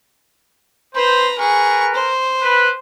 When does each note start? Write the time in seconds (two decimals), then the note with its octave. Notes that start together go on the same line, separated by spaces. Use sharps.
0.95 B4 C5 A#5
1.38 G#4 A#4 B4 C#6
1.94 C5
2.42 B4